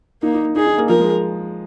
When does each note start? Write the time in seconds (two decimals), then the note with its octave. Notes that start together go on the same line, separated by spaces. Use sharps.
0.22 A#3 D#4
0.34 D#4
0.56 D#4 G#4
0.66 D#4
0.78 A#3
0.89 F3 A#4
1.00 G#3